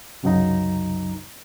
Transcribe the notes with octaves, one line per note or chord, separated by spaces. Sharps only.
C2 F#2 C#3 F#3 D#4 A#5